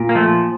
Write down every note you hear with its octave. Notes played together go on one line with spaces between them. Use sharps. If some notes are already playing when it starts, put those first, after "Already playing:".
Already playing: A#2
A#3
F3 A3